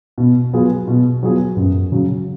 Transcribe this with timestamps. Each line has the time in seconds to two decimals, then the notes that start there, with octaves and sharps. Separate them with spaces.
0.18 B2
0.53 F#3 B3 F4 G#4
0.88 B2
1.23 F#3 B3 F4 G#4
1.57 F#2
1.92 C#3 F#3